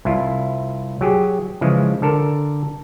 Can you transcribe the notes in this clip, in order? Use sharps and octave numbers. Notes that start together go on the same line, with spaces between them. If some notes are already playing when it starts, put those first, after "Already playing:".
C2 E4 F4
F#3 G4 G#4
C#3 E3 F3 G#3
D3 A4 A#4